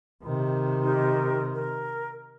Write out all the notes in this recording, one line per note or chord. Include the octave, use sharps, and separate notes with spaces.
C3 D#3
D#4 G4 A#4
A#4